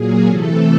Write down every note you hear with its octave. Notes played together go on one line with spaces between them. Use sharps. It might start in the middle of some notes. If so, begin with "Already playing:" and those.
Already playing: A#2 F#3 A#3 G#4
C3 E3 A3 A4